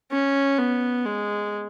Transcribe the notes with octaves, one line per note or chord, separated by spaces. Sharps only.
C#4
B3
G#3